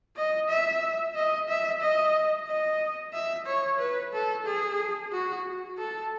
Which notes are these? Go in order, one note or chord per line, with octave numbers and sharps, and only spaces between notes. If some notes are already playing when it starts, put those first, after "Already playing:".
D#5
E5
D#5
E5
D#5
D#5
E5
C#5
B4
A4
G#4
F#4
A4